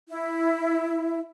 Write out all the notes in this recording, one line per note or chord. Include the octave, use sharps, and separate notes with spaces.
E4